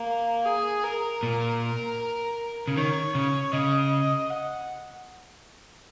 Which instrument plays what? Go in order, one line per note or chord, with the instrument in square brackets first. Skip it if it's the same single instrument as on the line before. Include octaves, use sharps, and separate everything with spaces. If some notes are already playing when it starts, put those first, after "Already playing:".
Already playing: [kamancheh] A#3
G#4
A#4
[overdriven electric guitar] A#2
C#3
[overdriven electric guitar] D#3 [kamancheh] C#5
[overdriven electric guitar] C#3
[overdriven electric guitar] C#3 [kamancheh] D#5
[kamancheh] F#5